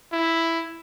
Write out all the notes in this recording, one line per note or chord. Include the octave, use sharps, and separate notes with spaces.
E4